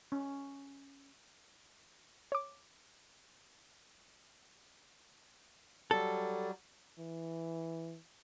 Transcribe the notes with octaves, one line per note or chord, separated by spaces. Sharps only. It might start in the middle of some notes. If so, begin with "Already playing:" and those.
C#4
C#5 D6
F#3 G3 A4
E3